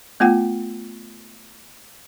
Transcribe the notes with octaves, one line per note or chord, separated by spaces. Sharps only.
A3 B3 F4 F#5 G5